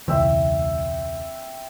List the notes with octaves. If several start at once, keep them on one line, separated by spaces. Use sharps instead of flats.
E1 C#2 E3 C4 E5